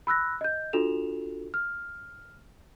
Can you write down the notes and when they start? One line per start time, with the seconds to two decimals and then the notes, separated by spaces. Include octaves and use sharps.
0.07 B5 E6 F#6 A#6
0.41 D#5 G6
0.73 D4 F4 F#4 A4 E7 F7
1.54 F6